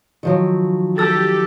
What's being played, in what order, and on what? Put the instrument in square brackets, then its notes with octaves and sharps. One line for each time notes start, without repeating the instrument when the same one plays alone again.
[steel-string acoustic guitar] D#3 F3 F#3
[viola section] G4 A4 [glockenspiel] A5 E6 A6